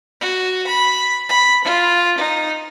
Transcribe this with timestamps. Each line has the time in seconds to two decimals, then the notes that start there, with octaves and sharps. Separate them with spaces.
0.21 F#4
0.67 B5
1.29 B5
1.64 F4
2.18 D#4